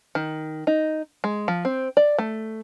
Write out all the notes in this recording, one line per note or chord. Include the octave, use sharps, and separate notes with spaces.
D#3
D#4
G#3
F3
C4
D5
A3